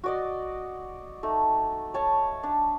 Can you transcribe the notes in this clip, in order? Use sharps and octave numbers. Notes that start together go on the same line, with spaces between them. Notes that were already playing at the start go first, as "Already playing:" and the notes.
F#4 D5 D#5
A3 D#4
C#5 A5
D4